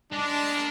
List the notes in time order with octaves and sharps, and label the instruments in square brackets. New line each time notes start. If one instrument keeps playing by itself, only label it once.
[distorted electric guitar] G#3 [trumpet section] D4
[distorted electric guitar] A#3